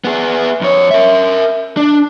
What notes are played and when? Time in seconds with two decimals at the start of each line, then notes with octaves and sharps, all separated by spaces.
0.05 B3 G#4
0.62 F2 C#5
0.91 A#4 E5
1.77 D4